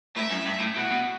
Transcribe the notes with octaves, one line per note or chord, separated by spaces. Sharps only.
A2 E5
F#2
G2
A2
B2 F#4
B2